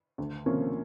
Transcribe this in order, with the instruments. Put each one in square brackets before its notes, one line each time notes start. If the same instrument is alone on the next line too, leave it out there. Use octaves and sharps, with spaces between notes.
[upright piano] D2
C3 F3 A#3 C#4